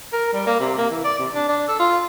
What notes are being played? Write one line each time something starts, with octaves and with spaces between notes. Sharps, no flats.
A#4
G3
A#3
C3
A#3
E3
D5
C3
D4
D4
A4
F4